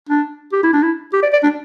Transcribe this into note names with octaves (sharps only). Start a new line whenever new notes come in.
D4
G4
E4
D4
E4
G4
D5
D5
D4